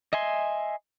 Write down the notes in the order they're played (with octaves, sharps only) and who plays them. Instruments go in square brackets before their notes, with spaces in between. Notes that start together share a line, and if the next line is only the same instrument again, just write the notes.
[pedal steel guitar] D#5 E5 G#5 C6